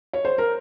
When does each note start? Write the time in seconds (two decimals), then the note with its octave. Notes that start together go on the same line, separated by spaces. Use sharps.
0.13 C#5
0.25 C5
0.38 A#4